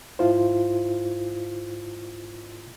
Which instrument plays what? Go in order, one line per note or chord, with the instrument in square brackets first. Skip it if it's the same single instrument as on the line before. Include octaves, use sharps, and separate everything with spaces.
[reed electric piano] G#2 E4 F4 C5